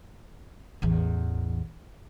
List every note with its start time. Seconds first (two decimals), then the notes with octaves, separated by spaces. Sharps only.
0.82 A1 E2